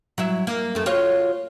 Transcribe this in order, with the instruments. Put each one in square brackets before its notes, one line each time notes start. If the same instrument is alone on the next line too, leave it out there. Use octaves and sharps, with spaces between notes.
[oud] F#3 E4 E5
A#3
F#2 A3
F4 F#4 C#5